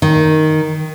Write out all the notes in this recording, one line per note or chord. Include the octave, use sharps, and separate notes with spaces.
D#3